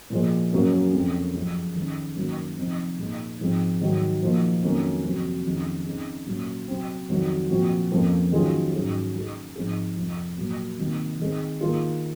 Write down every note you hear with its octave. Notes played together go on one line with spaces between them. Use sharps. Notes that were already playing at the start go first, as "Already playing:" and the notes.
A#2 F3 G#3
F#2 C#3 F#3 A#3 C#4
F2 C#3 F#3 C4
F#2 C#3 F3 G#3
D#3 G#3 C#4
F#2 D#3 A#3 C#4 F#4
C3 F3 C4 D#4
A#2 G#3 D#4
G#2 F3 G#3 C4
G#2 D#3 F#3
A#2 F3 A#3 D#4 F#4
F2 D#3 F#3 A#3 C#4
F2 C3 F#3 C4
F2 D#3 G#3 C#4
C#3 G#3 C4 D#4
A#2 F#3 C#4
C3 F#3 C4
F2 D#3 F#3
A#2 F3 C4 F#4
F2 C#3 F3 A#3
D#3 F#3 C#4 F4 G#4
G#2 F#3 C#4 G#4
C#3 G#3 D#4 G#4
G#2 F3 C4 D#4 G#4
F2 C3 F3
A#2 F#3 A#3
C3 D#3 A#3
D#3 G#3 C4
D#3 A#3 F4 G#4